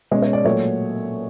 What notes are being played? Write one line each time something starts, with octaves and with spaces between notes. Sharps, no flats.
B2 G#3 C#4 C#5
C#5
D5
A#2 F#3 A3 C#5